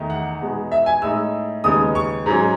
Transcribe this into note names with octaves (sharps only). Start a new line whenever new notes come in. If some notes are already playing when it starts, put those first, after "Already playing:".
Already playing: E2 D#3 A3 D#4
F#5
E2 B2 G#3 B3 D#4
E5
G#5
A2 G#3 D#4 E6
D#2 C#3 G#3 B3 D#4 D#6
C#6
G#2 F#3 C#4